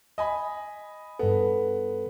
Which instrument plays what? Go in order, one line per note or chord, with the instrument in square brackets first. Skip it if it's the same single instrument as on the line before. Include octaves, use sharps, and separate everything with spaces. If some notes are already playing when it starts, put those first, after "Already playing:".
[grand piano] D#5 G#5 B5
[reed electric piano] G2 A4 [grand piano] B3